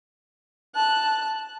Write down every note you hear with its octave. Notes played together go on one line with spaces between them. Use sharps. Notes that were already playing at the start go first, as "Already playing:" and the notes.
A5 F#6